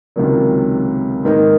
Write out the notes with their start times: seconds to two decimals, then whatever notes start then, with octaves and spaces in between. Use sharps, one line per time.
0.16 C#2 C3 D#3 F#3 A#3
1.24 G#2 D#3 A#3 D#4